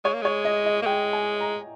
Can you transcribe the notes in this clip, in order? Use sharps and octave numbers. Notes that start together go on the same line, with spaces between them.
G#3 C#5
A#3
G#3 C#5
D#5
D#5
A#3
G#3 G5
G#5
A#5